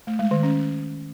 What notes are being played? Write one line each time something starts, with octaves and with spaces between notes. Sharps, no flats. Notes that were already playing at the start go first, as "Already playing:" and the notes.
A3
G#3
D#3
C#4